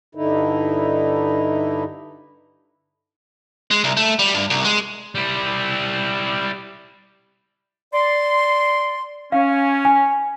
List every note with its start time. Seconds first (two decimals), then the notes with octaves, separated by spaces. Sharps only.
0.15 G2 D3 D#4 E4
3.71 G#3
3.84 C2
3.97 A3
4.19 G3
4.34 G2
4.50 C2
4.65 G#3
5.15 G3 E4
7.93 D5 C6
9.32 C#4 F5
9.85 G#5